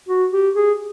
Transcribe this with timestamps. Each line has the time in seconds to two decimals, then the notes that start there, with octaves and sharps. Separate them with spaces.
0.09 F#4
0.33 G4
0.56 G#4